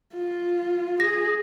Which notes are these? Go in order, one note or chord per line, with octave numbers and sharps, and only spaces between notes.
F4
G#4 A#6